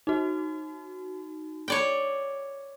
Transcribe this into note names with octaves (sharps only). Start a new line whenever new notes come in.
D#4 F#4
C#5 D5 G5